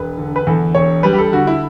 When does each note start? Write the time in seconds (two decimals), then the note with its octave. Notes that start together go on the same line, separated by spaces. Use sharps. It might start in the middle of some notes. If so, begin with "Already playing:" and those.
Already playing: E1 B4
0.18 D3
0.36 B4
0.47 E2 A4
0.75 E1 C#5
1.03 G3 B4
1.13 G4
1.18 A4
1.32 D3 F#4
1.47 E4